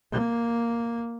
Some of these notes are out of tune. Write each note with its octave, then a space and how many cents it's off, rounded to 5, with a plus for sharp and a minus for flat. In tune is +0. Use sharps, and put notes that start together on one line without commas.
A#3 +0